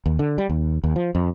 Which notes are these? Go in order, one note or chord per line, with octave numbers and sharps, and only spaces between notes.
D#2
D3
G3
D#2
D#2
F3
F2